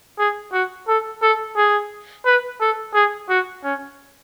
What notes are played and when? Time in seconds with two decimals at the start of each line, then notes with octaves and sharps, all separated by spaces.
0.19 G#4
0.53 F#4
0.88 A4
1.22 A4
1.57 G#4
2.26 B4
2.60 A4
2.94 G#4
3.29 F#4
3.64 C#4